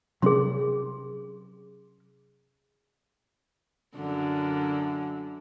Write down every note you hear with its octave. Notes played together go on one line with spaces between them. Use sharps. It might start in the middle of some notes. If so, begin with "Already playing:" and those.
C3 F#3 C#4 G#4 C6
F#2 D3